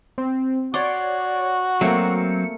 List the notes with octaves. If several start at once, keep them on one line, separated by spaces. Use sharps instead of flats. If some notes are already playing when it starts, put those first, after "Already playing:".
C4
F#4 C#5 D5 C6
F#3 A3 A#3 C4 C#7